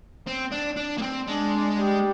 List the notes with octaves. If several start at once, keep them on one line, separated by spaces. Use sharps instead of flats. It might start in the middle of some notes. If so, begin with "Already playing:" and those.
C4
D4
D4
A#3
C4
G#3 D4
G3